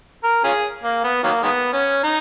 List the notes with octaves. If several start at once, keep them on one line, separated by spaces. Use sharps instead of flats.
A#4
C#4 F4 G#4
A#3
B3
D#3 F#3 A#3
D#3 G#3 B3
C#4
D#4